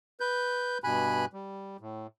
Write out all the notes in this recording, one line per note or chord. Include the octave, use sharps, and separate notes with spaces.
B4 G6
G2 B2 G#5 B5 F#6
G3
A2